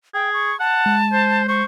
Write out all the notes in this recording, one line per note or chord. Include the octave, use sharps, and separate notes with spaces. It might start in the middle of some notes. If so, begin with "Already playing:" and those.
G#4 G5
C#6
F#5 A5
G#3
C5
C5 C#6